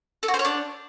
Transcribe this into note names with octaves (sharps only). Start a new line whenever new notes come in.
A4
F#4
C5
C#5
D4